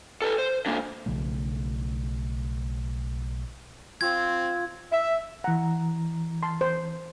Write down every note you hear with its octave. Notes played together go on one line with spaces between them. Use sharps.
A4 B4
C5
D3 A#3
B1 C#3 F3 A3
C4 F4 G#6
E5
E3 F#5 A#5
A5 C6
C5